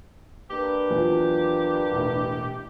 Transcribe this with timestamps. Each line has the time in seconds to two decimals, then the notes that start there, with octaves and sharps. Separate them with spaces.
0.50 A#3 D4 G4 B4
0.90 E2 F3 F#3
1.91 E1 A2